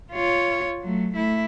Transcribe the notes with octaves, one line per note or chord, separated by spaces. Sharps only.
F4 C#5
F#3 A3
A3 E4